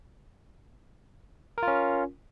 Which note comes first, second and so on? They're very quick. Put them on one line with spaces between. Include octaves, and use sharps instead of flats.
A#4 F4 C#4